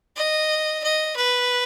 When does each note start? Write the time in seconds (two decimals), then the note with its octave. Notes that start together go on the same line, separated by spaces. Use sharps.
0.16 D#5
0.83 D#5
1.16 B4